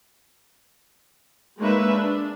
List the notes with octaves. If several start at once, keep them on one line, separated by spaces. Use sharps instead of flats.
G#3 A#3 D#4 B4 C#5 E5
D4